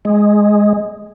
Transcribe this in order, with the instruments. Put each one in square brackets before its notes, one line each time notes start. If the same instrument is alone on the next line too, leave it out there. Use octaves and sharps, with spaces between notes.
[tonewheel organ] G#3